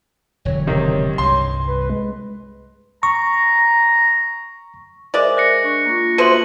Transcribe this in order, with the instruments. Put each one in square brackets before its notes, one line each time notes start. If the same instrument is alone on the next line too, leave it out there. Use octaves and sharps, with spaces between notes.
[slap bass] E1 D3 F#3 [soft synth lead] C#5
[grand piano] C3 D#3
[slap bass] C2 G2 [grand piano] C6
[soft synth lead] B4
G#3
[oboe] A#5 [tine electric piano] C#6
[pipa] G#3 D5 [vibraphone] A#4 C5 E5
[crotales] F#6 A#6 C#7
[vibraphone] D4 C#6
A#3 F4
[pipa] B2 A3 C5 [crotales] D#7 F#7